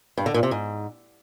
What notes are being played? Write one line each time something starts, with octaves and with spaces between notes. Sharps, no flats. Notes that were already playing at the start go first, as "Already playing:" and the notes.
G2
D3
A#2
C3
G#2